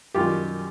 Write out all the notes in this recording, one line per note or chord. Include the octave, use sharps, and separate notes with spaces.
F#2 D#3 G3 F4 G4